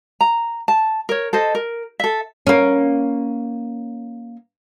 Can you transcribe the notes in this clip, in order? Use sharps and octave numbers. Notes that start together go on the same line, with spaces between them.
A#5
A5
A#4 C#5
A4 C5 D#5
A#4
A4 E5
A#3 C#4